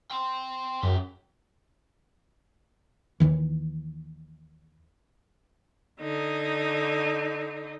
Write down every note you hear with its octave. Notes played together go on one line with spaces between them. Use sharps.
G5 C6
F#2 G#4 G5
D#2 C3 D#3 E3
D3 D#4